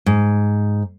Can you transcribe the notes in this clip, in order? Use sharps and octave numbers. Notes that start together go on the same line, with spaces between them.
G#2